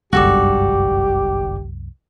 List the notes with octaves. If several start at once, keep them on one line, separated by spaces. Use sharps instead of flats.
G1 C2 F#2 G#3 F#4 G4 A4 D5